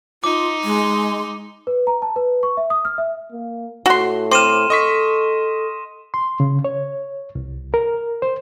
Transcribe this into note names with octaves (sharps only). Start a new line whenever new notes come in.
D#4 F4 D6
G#3
B4
A#5
A5
B4
C#6
E5
D#6
F6
E5
A#3
A2 F#4 C6
C4 C6 D6 F6 D#7 E7
A4 D#5 C#6 B6
C6
C#3
C#5
C2
A#4
C5